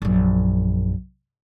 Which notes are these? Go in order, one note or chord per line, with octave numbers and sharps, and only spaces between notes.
A#1 F#2